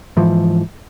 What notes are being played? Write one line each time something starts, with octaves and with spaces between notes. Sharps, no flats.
G#2 E3 F3